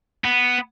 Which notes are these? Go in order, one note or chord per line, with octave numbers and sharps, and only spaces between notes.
B3